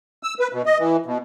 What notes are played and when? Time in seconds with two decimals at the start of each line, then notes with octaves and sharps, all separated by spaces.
0.23 E6
0.39 B4
0.53 B2
0.66 D#5
0.79 E3
1.06 B2